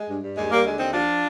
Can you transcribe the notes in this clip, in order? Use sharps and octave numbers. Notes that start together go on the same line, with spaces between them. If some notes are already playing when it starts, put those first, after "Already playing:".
Already playing: G#3
G2
G2
D#2 G#3
D#2 G3 A#3
D3 G#3
D#2 C4 D#4
F3 D4 F4